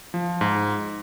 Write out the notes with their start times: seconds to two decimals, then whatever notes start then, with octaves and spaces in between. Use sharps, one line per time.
0.14 F3
0.41 G#2